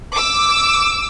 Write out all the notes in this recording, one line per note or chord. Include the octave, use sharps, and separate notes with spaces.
D6 E6